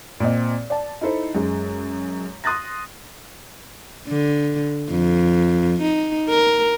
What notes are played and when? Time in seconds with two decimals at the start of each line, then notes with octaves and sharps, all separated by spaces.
0.20 A#2 C4 D#5
0.70 D5 A5
1.01 D#4 E4 A4 C5
1.35 F#2 G#3
2.44 C6 D#6 F#6 A6 A#6
4.08 D3
4.90 F2
5.82 D#4
6.29 A#4